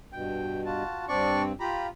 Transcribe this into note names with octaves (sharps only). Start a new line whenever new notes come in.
G2 B2 G5
F4 F#4 A5
G2 C4 D4 D5 C#6
F4 G4 A#5 B5